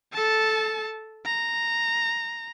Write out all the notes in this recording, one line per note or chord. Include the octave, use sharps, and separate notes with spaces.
A4 A5
A#5